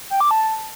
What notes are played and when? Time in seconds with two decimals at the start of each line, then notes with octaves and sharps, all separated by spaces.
0.10 G5
0.21 D6
0.31 A5